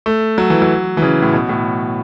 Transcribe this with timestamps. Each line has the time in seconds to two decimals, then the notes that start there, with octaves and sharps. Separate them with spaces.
0.06 A3
0.38 F#3
0.50 E3
0.62 F#3
0.97 E3
1.02 C#3
1.22 A2
1.33 B2
1.49 A2